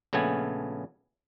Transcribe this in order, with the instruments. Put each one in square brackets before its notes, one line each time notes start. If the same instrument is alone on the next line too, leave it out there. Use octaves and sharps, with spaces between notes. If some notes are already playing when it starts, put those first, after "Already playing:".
[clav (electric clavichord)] A#1 C#3 A3 B3 G#5 A5